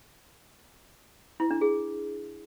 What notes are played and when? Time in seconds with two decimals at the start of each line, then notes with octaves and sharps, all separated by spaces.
1.40 E4
1.51 D4
1.61 G#4